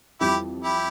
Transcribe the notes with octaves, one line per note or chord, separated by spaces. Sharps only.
F2 E3 G3 E4 G4
E4 G4